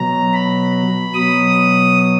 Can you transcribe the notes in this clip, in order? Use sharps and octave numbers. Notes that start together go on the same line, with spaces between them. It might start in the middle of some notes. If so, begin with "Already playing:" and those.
Already playing: B2 F#3 A#5
B5
B2 F#3 D#6